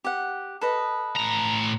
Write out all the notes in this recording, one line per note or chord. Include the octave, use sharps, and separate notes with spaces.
G4 F#5
A4 B4 D#5
A2 A#5